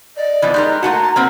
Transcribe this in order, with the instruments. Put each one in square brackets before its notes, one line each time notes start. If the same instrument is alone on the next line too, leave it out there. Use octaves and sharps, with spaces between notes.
[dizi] D5 [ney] D#5
[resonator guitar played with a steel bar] E3 F3 B3
[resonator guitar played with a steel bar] G#3 G4 A#4 [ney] D#4 [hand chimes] C6 F#6 G6
[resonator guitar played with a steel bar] A3 A#3 F#5 [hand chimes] F#4 [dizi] A5 [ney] A#5
[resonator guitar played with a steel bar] A#3 C4 B4 [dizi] F#5